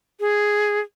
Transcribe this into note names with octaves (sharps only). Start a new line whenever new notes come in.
G#4